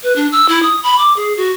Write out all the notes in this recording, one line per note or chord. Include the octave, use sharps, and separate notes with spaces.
B4
D4
E6
E4
D#6
B5
D6
G#4
F#4